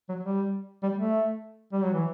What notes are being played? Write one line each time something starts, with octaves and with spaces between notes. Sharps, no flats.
F#3
G3
G3
A3
G3
F#3
E3